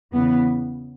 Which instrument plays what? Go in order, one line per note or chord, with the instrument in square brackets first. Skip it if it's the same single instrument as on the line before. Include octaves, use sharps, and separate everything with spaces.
[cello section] E2 C#3 E3 B3